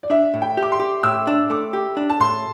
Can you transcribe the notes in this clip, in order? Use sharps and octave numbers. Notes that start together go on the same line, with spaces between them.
D5
D4 E5
A2
G5
G4
D6
C6
G4
A2 E6
D4
A3 D6
G4
D4
A5
A2 C6